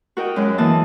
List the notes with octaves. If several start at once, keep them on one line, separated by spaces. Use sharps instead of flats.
F#4 A#4 D#5 G5
F#2 G#3 F#6
E3 A#3 A5 D#6